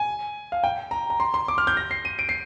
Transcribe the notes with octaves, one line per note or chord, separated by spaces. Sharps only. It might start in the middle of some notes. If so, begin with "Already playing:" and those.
Already playing: G#5
F5
G5
A#5
A#5
C6
C6
D6
F6
G6
A#6
C7
D#7
D7
C7